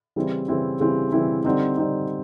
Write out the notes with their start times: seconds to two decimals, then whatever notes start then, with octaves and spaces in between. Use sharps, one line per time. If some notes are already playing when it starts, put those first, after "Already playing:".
0.16 C#3 E3 G3 C4 E4
0.48 C#3 E3 G3 C4 E4
0.80 C#3 E3 G3 C4 E4
1.12 C#3 E3 G3 C4 E4
1.45 D3 G3 C4 D#4
1.77 D3 G3 C4 D#4